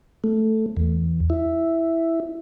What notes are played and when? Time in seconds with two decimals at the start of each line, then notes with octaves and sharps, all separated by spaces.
0.24 A3
0.77 E2
1.30 E4